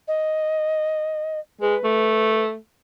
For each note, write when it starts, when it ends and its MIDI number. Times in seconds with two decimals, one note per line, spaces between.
0.08 1.40 75
1.61 1.75 56
1.61 2.44 71
1.84 2.56 57